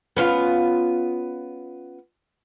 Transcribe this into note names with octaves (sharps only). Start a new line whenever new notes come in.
B3 C#4 F4